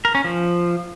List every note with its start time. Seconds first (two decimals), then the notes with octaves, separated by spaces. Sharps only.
0.05 A#4
0.15 C#4
0.25 F3